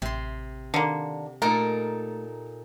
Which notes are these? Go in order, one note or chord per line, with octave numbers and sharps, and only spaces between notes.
A1 C3 C6
D3 D#3 A#3
A#2 A3 D#4 A4 A#4